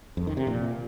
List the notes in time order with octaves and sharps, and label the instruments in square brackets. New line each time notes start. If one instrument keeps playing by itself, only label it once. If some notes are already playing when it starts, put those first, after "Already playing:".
[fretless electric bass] F2
D#3
C3
A#2